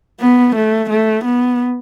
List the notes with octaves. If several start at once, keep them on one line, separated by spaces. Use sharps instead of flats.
B3
A3
A3
B3